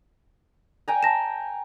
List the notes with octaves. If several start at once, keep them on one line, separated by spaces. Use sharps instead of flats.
G5 G#5 A#5
A5 A#6 E7